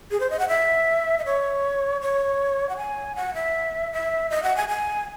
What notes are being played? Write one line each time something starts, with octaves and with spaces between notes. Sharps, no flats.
G#4
C5
D#5
F#5
E5
D#5
C#5
C#5
F#5
G#5
F#5
E5
E5
D#5
F#5
G#5
G#5